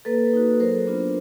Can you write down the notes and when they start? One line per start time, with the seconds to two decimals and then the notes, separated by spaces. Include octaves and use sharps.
0.05 A#3 A4 B4
0.33 D#4 F#4
0.60 F#3 A#4 C5
0.87 B3 D4 F4